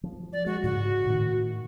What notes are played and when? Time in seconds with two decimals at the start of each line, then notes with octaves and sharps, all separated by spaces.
0.03 F3
0.33 D5
0.46 G#3 F#4
0.64 G#2 C#3 F#4
1.06 A2 D#3